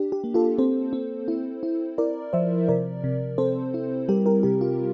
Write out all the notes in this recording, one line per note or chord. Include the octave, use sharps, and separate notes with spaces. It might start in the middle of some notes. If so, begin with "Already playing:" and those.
Already playing: D4 G4
G4
A#3
F4 A4
C4 A4 C5
C4
E4
E4
E4 A#4 D5
F3 C5 E5
C3 A#4 D5
C3
C4 A4 C5
E4
G3 G4 A#4
G4 A#4
C3 G4
F4